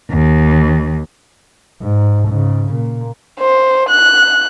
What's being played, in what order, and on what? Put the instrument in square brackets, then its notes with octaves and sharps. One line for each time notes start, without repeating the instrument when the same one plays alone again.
[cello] D#2
[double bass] G#2
G#2 C#3
A#2
[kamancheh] C5
F#6